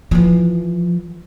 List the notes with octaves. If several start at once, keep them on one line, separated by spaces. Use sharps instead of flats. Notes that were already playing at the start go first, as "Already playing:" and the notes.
E3 F3